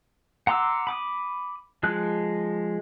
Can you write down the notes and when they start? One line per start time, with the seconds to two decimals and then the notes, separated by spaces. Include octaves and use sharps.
0.47 F#5 A#5 C6 D6 E6
0.87 B5 D6 D#6
1.83 F3 G#3 F#6